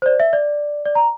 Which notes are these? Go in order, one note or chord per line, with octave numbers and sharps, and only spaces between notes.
C5
D5
E5
D5
D5
A#5